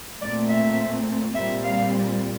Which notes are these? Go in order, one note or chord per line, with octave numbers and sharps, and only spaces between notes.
A#2 A3 C4 D5
E5
A#2 G3 C4 E5
F5